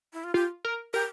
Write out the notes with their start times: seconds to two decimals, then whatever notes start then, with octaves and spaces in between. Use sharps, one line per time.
0.13 E4
0.24 F4
0.34 F4 G4
0.65 A#4
0.94 G4 A#4